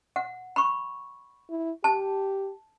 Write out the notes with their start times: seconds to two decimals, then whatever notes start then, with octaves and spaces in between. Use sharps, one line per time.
0.16 F#5
0.56 B5 C#6
1.50 E4
1.84 G4 A5